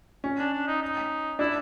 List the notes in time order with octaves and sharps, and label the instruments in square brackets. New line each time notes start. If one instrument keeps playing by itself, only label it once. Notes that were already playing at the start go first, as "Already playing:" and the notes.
[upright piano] C#4
[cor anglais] D4
D4
D#4
D#4
[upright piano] D4 [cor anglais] E4